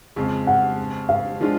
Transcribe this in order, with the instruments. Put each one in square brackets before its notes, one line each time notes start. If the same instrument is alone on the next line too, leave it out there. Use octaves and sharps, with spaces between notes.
[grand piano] F2 C#3 G#3
[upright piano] F#5
F5
[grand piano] F3 G#3 D4 F4